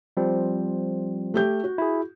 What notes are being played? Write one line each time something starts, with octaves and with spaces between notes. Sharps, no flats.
F3 G3 C4
A3 G4 G6
F#4
E4 G#4